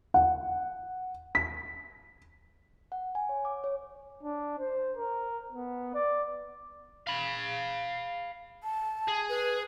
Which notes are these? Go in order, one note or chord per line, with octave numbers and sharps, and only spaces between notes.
F#5
B6
F#5
G#5
C#5
D6
C#5
D4
C5
A#4
B3
D5
F5 B5
A5
G#4
B4